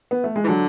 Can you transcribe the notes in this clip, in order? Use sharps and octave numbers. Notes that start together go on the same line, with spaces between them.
B3
A3
G#3
E3
D3 F#3